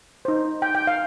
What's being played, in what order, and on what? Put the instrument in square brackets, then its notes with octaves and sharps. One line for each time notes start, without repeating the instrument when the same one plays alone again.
[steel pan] D#4 C5
G5
G5
F5